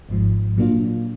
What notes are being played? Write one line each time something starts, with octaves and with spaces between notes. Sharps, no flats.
G#1 G#2 F3
A#2 F#3 A#3 D4 F4